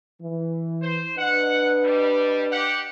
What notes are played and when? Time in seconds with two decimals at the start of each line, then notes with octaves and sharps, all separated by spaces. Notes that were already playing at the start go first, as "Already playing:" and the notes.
0.21 E3
0.82 C5
1.17 D4 B4 D#5 F#5
1.83 G3
2.51 G4 F#5